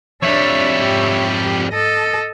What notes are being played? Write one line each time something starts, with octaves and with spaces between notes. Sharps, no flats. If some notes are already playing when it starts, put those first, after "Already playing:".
F2 G3 D4 C#5 E5
G#2 G4
A4 D#5